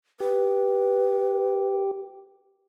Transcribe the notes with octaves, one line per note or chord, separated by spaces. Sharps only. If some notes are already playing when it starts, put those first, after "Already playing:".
G4 B4